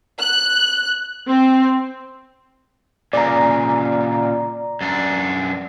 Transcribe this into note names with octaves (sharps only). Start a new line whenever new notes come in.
F#6
C4
A#2 C#3 D5 A#5
F#2 D4